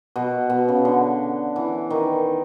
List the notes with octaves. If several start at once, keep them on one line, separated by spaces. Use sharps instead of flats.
B2
B2
C#3
D3
E3
D#3